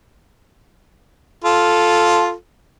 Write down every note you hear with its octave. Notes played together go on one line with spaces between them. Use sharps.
F4 A4